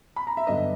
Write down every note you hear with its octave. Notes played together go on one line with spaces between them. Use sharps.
B5
A#5
E5
G2 D3 F#3 B3 D#5